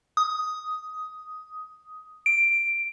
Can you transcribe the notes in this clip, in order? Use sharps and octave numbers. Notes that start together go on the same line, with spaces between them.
D#6
D7